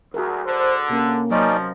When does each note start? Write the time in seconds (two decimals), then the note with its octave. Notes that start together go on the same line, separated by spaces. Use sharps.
0.14 D2 F#4 G#4 A#4
0.45 D3 C5
0.90 C3 A#3 C#4
1.31 F3 F#3 C#4 D#4 A#4 D5 D#5